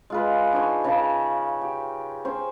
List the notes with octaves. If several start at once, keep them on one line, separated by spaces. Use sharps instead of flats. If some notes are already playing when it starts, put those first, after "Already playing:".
G#3 F4 B4
D4 D#4 C#5 C6
C#3 A#4 B4 A5
G4
C#4 C5